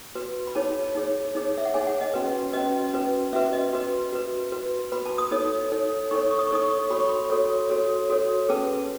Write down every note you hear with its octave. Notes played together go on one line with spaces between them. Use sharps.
F#4 B4
B5
D#4 G#4 C#5 A5
D#4 G#4 C#5
D#4 G#4 C#5
E5
F#5
D#4 G#4 C#5 G#5
F#5
D#5
C#4 F#4 B4
C#4 F#4 B4 D#5
C#4 F#4 B4
C#4 F#4 B4 E5
D#5
F#4 B4
F#4 B4
F#4 B4
F#4 B4 B5
A5
D#6
D#4 A4 C#5 D#6
D#4 A4 C#5
D#4 A4 C#5 C#6
C#6
D#6
C#6
D#4 A4 C#5 D#6
C#6
F#4 A4 C#5 B5
C#6
B5
F#4 A4 C#5
F#4 A4 C#5
F#4 A4 C#5
C#4 G#4 B4 A5